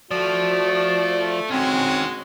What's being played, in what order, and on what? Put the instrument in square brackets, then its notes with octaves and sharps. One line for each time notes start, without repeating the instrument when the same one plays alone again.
[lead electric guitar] F3 [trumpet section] A3 [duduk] F#4 [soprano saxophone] D5
[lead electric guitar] D#3 C#4 [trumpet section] G#3 F#4 [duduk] C4